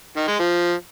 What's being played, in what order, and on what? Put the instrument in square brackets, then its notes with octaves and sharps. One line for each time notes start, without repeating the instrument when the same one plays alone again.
[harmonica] D#3
G#3
F3